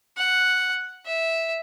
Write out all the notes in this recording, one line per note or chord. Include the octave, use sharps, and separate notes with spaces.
F#5
E5